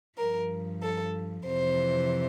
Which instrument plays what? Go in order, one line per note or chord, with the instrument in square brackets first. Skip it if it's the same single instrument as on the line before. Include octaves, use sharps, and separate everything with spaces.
[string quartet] G2 F3 A#4
A4
F2 C3 E3 C5